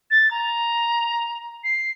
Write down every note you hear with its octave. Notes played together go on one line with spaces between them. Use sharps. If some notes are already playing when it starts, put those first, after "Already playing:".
A6
A#5
C7